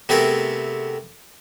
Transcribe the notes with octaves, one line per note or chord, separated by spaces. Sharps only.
C3 A3 B3 C4 G#4 A#4